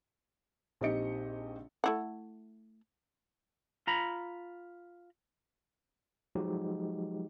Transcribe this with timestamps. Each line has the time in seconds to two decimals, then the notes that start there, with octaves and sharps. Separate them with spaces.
0.81 A#1 C4 D#4 G4 D#5 C#7
1.84 A3 E4 F#5
3.87 F4 A#5 B5
6.35 F3 F#3 G#3 D#4 F#4 G4